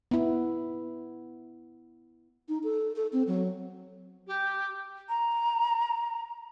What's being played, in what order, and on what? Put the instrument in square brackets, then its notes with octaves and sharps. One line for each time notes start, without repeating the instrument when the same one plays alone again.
[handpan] B3 E4
[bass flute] D#4
A4
A4
C4
F#3
[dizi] G4
[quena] A#5